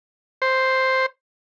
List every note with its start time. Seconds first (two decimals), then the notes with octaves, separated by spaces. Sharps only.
0.42 C5